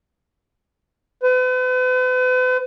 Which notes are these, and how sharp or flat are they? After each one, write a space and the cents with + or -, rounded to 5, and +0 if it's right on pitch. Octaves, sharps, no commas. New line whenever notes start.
B4 +45